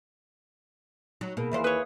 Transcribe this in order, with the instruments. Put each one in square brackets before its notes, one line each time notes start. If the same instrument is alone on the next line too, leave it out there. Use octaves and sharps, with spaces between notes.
[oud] F#3 [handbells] D#4
[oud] B2 [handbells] A#3 G#4 A#4
[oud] D#2 E3 C5 [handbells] E5 F5
[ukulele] B4 C#5 [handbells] D#6